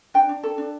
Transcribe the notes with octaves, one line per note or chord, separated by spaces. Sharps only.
D4 G5
D4
A4
D4